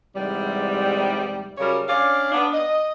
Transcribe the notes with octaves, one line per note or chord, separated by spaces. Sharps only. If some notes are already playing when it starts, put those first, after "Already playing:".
E2 G#2 C3 G3
C#3 F#3 G3 A#4 C#5
C#4 D4 D5 F5
B3 D4
D#5